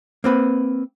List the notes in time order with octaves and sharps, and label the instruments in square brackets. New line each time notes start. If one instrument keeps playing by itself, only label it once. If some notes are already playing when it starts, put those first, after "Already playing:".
[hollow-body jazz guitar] A#3 C4 B4